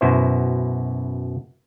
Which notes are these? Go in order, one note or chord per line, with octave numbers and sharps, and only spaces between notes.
F#2 B2 E4 C5